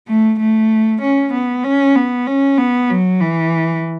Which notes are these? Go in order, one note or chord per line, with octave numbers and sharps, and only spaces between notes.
A3
A3
C#4
B3
C#4
B3
C#4
B3
F#3
E3